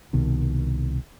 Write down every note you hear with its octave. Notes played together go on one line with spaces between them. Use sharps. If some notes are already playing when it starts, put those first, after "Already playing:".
C2 B2 D#3